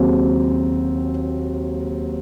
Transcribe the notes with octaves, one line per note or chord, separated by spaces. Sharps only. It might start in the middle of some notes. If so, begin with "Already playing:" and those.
Already playing: D#2 C#3 F#3 C4 F#4